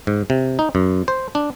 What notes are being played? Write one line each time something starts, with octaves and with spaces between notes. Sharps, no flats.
G#2
C3
D#4
F#2
C5
D4